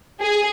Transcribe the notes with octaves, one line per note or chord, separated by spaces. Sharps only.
G#4